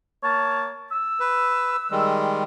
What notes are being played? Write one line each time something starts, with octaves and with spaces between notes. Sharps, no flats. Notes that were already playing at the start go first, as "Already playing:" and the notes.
A#3 C#5 A5
E6
B4
D#3 G3 G#3